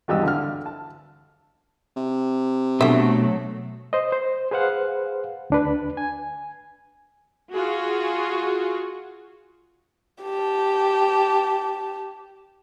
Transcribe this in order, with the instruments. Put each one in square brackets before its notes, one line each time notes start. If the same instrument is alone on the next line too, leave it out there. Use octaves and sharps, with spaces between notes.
[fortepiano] G#1 E2 G2 G4 D#5 E6
D3 F5 F6
A5
[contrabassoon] C3
[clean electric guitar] B2 [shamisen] D3 E5 [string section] F#3 A3
[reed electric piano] C5 D#5
C5
G#4 B4 C5 F5 F#5
D2 D4 B4
G#5
[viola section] F4 F#4 G#4
[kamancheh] G4 A5